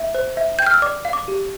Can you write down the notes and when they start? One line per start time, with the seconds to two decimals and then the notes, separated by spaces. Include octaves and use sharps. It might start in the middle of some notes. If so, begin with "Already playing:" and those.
Already playing: E5
0.15 C5
0.37 E5
0.59 G5 G6
0.67 F6
0.74 E6
0.82 D5 D6
1.05 F5
1.13 D6
1.28 G4